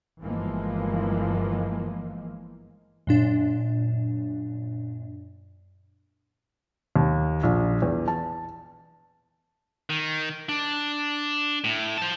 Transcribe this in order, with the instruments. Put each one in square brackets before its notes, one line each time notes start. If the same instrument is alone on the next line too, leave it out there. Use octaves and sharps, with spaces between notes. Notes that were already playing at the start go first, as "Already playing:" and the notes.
[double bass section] G1 E3 F3 G#3 A#3
[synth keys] F#2 A#2 D4
[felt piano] D#2
A#1
E2
A5
[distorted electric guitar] D#3
D4
A2
C5 A5